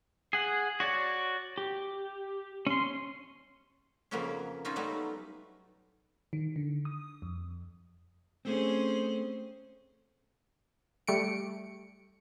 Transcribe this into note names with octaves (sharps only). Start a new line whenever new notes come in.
G#4 F#5
F#4 C#5 D5
G4
C#4 C6
F2 C#3 F#3 A#3 B3 C#4
F#3 C#4 D#4 F4 D#5
F#3 G3 A3 B3 C#4 D#4
D#3
D3
D#6
F2
A3 C4 C#4 G#4 C5
G3 A3 C#7 D7